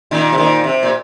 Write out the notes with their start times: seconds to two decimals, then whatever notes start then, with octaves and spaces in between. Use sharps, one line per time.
0.11 A#2 D#3
0.32 C3
0.38 A#2 D#3
0.64 C3
0.83 A#2